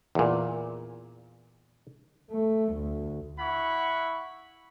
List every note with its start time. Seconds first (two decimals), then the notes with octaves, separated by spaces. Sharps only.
0.15 E2 A#2
2.31 A3
2.73 D2
3.39 E4 E5 F#5 B5 C#6